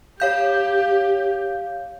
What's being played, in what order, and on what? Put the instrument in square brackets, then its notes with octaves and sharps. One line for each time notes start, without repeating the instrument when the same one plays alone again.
[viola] G4 [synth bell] C#5 F5 G6